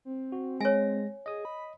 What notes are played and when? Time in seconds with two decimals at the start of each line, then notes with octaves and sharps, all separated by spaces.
0.05 C4
0.32 F#4
0.60 G#3 C#5 G#5 A#6
1.26 G#4 D#5 D#6
1.45 B5